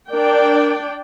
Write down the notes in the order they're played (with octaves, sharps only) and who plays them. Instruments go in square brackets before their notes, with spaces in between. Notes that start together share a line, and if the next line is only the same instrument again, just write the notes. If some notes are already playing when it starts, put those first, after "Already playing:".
[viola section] D4 D5 G5 [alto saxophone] A#4